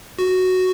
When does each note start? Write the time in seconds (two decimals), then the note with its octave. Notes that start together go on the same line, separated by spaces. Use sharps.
0.19 F#4